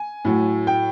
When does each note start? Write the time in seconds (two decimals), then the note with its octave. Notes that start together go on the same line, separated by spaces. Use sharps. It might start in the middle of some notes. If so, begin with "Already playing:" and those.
Already playing: G#5
0.25 A2 F#3 A3
0.67 G5